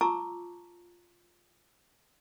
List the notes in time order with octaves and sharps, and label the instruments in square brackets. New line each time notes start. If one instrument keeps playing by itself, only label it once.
[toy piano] F4 A5 A#5 C#6 D6 E6